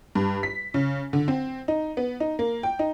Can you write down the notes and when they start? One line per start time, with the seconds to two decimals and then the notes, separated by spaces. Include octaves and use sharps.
0.15 G2
0.43 B6
0.74 C#3
1.13 D3
1.28 C4
1.68 D#4
1.97 B3
2.20 D#4
2.39 A#3
2.63 G5
2.79 D#4